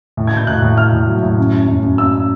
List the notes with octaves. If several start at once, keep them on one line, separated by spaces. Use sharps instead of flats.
A2
G#6
A2 G6
A2 F#6
A2
A2 F6
A2
F#3
A2
F#2
F#2
F#2
F#2
F#2 E6